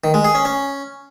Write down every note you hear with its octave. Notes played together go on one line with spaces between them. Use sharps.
D#3
G#3
G#4
C#4
C#4